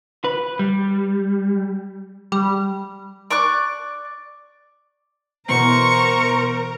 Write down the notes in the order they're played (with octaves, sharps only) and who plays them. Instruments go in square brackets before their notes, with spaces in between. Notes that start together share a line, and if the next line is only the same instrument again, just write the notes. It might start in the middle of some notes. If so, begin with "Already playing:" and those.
[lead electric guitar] B4
G3
[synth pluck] G3
[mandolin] D5 C#6 D6 F#6
[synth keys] B2 E3 B3 [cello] A#4 [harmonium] C5 A#5 [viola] C#6